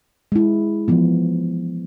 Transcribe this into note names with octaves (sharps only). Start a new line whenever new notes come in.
G#3 E4
E3 F3 B3